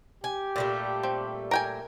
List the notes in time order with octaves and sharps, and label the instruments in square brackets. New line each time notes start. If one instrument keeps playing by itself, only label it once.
[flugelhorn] G4 [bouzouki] G#5
[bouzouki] A#2 G3 A3
[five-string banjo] C4
A#4 G5 G#5